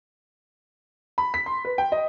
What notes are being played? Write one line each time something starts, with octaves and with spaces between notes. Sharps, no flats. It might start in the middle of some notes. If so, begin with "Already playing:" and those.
B5
B6
C6
B4
G5
D#5